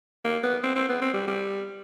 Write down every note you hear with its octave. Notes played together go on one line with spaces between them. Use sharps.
A#3
B3
C4
C4
B3
C4
G3
G3